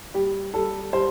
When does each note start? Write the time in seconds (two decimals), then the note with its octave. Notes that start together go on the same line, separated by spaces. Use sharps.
0.14 G3 G4
0.54 G3 A4
0.93 G3 C5